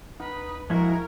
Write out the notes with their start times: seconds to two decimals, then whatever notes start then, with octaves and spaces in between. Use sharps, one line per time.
0.20 D2 D#4 B4
0.70 F3 G#3 E4 F#4 A#4